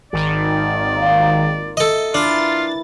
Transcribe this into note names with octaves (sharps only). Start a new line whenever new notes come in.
G#1 D#3 D5
A#3 F4
A4 D#5 E5
E3 D4 F4 A#4 A6